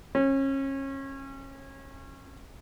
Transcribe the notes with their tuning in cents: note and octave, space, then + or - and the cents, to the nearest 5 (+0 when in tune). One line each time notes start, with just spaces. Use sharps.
C#4 -30